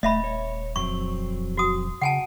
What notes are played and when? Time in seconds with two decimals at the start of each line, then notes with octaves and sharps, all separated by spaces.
0.03 D#1 A3 D#5 E5 B5
0.24 C#5
0.76 F2 F#3 C4 C#6
1.57 F#4 D#6
2.02 C#3 F#5 G#5 A5